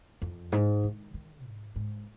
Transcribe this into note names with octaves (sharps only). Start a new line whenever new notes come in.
F2
G#2
D#3
D#3
G#2
G#2